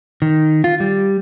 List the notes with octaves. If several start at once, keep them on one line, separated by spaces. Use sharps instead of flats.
D#3
F4
G3